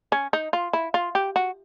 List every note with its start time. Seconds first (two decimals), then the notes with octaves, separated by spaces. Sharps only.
0.12 C#4
0.33 D#4
0.53 F4
0.73 E4
0.94 F4
1.15 G4
1.36 F#4